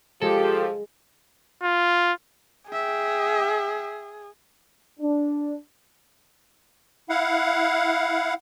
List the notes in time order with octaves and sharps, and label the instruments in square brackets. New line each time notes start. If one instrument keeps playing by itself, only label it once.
[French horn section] F3 [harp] G#3 [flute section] G4 [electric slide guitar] A4
[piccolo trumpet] F4
[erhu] G#4 [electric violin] E5 G5
[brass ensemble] D4
[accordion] E4 F5 F#5